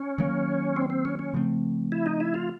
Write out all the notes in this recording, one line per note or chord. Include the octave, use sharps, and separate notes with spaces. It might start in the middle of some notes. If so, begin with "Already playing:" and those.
Already playing: C#4
D#3 F#3 A#3
C4
C4
C#4
C#4
C#3 F3 A3 C4
E4
D#4
E4
F4